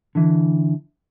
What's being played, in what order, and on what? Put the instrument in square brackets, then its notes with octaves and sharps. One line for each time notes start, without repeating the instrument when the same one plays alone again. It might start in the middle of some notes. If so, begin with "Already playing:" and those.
[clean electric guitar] D3 E3